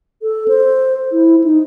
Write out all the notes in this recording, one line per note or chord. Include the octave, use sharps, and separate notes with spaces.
A4
C5
E4
D#4